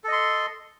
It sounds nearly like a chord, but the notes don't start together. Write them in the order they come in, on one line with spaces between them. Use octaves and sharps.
A4 D#5 C6